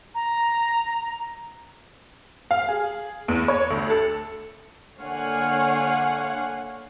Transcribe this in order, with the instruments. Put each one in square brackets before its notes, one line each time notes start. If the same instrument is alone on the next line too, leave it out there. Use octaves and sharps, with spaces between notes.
[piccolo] A#5
[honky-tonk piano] F5
G#4
E2
C#5
D2
A4
[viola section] D3 A#3 C#5 F5 F#5 G#5